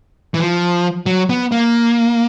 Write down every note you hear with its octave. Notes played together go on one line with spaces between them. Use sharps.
E3
F3
F#3
B3
A#3